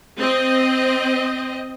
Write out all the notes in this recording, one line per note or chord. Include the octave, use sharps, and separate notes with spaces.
C4 D#5